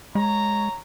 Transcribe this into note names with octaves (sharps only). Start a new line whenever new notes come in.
G#3 C#5 A#5